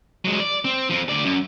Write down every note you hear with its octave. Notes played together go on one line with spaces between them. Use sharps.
F#3 G#3
D5
C4
F3 C4
D2 D5
F#2